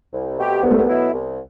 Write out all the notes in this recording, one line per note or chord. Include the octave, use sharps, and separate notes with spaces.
C2
B2 A3 C4 G4
C2 B3
A3
B3
B2 F#3 A3 E4
C2